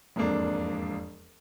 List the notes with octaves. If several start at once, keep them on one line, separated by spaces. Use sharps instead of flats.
E1 F2 G#2 A#3 D4